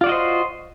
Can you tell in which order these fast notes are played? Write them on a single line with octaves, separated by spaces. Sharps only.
F4 D5 F#4 D#5 C5